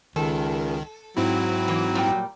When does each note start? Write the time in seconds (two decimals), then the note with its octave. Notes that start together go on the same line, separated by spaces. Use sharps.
0.16 C#2 D#3 A4
1.17 G#2 F#3 C4 E4
1.68 E3 A#3
1.95 A#2 G3 G5